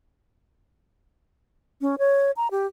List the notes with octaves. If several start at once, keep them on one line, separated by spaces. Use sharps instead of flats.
C#4
C#5
A#5
G4